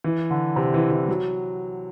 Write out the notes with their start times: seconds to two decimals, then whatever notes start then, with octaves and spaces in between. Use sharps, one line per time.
0.04 E3
0.30 D3
0.56 C3
0.74 E3
0.91 E3
1.08 F#3